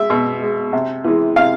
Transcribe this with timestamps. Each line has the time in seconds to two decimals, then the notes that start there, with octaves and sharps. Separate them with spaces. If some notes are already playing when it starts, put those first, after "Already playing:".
Already playing: G#3 E5
0.10 B2
0.42 G#3
0.73 C3
1.04 E3 G#3
1.36 C3 F5